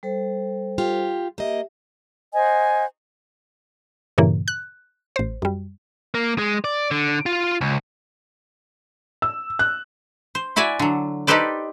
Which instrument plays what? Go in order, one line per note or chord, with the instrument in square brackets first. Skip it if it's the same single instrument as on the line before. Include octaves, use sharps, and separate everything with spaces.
[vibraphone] G3 A4 C5
[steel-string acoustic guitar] F4 G4
[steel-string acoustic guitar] A#3 D#5 [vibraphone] G4 E5
[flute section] C5 D#5 F#5 G#5
[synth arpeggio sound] G2 A#2 C#3 E3 A#3
F#6
A1 C5
F#2 G3
[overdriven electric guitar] A#3
G#3
D5
D3
F4
C#2
[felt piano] E6
F#6
[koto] C5
E4 F#4 D5 E5 G#5
D3 F#3
D#4 G4 A4 B4 C5 D5